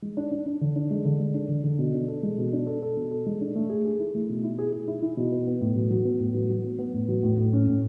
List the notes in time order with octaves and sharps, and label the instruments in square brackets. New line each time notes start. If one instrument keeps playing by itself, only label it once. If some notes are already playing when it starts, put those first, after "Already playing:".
[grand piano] G#3
D4
D4
D4
D3
D4
G#3
D3
G#3
D4
D3
D3
B2
D4
A4
G#3
B2
D4
A4
A4
B2
A4
G#3
D4
A3
G#4
G#4
E4
A3
B2
E4
G#4
G#4
E4
E4
B2
B3
B3
A2
F#3
F#3
B3
A2
F#3
F#3
B3
B3
A2
F#3
A2
A2
C#4
A2